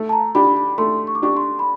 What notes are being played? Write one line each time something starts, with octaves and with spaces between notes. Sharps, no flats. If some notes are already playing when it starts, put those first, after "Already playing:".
Already playing: A3
A5
A#5
D4 G4 B5
B5
A3 C6
C#6
D6
D4 G4 C#6
C6
B5